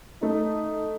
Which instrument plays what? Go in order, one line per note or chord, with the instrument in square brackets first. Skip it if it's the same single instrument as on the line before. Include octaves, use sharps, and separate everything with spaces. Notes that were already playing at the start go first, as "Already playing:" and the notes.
[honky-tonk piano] A3 [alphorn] D#4